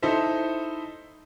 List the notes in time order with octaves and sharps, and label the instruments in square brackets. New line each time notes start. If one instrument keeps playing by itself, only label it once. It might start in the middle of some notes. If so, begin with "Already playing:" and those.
[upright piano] D#4 E4 A4 C5 E5